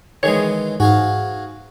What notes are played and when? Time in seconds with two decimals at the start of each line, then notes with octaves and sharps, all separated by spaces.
0.23 D#3 E3 G#3 G#4 C#5
0.80 G#2 F#4 G#4 F5